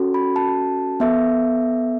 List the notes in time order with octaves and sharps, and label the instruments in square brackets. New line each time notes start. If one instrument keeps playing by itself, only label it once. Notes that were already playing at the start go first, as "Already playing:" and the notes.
Already playing: [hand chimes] C#4 F#4 A4
B5
A5
B3 A4 E5